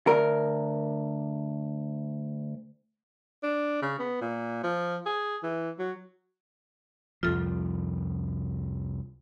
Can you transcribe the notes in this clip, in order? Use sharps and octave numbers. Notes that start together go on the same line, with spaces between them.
D2 A#4
D4
C#3
B3
A#2
F3
G#4
E3
F#3
C2 F2 F3 F4 A4